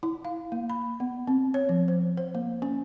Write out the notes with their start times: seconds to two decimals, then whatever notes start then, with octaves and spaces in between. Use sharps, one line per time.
0.03 E4
0.25 F5
0.52 A#3
0.70 B5
1.00 B3
1.27 C4
1.54 C#5
1.69 F3
1.88 C5
2.18 C5
2.35 A#3
2.62 C#4